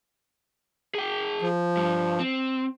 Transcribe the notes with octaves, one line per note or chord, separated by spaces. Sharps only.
G#4 G5
F3
G2
C4